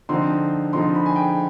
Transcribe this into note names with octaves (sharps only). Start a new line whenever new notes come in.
D3 F3 C4 D#4 C6
D3 F3 C4 D#4 C6
B5
G#5
G5